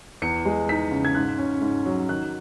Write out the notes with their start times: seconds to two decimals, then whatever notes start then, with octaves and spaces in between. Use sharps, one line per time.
0.22 E2 C#7
0.45 G#3
0.69 D#4 B6
0.91 C#3
1.05 G#6
1.15 G#2 F#6
1.38 C#4
1.61 G#2
1.85 F#3
2.09 D#3 F#6